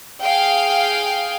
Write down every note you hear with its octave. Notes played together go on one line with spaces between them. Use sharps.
G#4 F5 G5